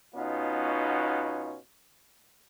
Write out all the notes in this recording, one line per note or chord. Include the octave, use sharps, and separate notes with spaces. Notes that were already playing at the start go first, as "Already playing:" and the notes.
B2 B3 C#4 D#4 F4